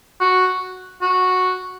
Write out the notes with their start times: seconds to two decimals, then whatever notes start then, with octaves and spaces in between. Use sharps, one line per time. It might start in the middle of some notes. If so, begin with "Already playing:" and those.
0.20 F#4
1.02 F#4